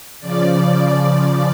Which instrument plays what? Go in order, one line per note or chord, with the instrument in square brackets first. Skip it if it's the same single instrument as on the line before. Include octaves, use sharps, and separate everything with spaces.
[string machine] C#3 F3 D5